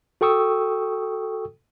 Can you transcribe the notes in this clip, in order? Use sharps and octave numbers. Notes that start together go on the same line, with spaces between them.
F#4 A4 G5 C#6 D#6 E6